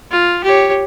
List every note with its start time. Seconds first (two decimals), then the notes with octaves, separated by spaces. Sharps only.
0.11 F4
0.43 G4 C#5